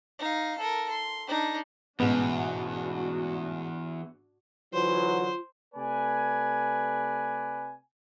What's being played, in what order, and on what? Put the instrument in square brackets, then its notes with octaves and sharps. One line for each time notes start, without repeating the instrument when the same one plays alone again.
[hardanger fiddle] D#4 F5
A4 A#4
C6
D4 D#4
[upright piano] A1 G#2 B2 [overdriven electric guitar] E2 [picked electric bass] B3 [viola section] D4 F#4
[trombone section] D3 E3 F#3 [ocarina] F4 [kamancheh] C5
[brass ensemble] C3 A3 B4 D5 G#5